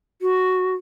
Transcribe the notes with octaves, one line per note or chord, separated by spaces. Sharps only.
F#4